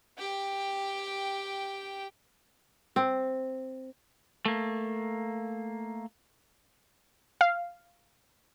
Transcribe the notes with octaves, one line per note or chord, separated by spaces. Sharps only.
G4 G5
C4
A3 A#3
F5